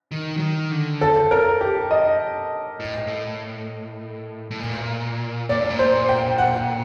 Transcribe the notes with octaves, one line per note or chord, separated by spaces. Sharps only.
D#3
F#3
D#3
D3
A4
A#4
G4
D#5
A2
A2
A2
A#2
A#2 D5
A2
A#2
C5
G5
F#5